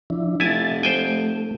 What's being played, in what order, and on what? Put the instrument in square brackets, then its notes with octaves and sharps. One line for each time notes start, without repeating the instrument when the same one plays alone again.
[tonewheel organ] F3 D4 E4
[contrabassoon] F1 [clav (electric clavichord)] E4 G#5 [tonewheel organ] A6
[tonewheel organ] A3 [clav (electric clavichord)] C5 G5 G#5